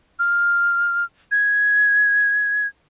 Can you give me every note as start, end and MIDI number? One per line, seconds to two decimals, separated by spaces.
0.19 1.04 89
1.31 2.67 92